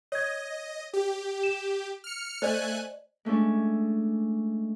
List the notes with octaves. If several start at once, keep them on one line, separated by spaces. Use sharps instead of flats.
C#5 D#5 G#6
G4
E7
F6 C#7
A3 C5 D5 D#5 G#5 F#6
G#3 A3 C#4 D4